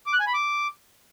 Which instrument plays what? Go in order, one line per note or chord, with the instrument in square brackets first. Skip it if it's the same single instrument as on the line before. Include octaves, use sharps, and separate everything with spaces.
[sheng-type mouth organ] D6
F#6
G#5
B5
D6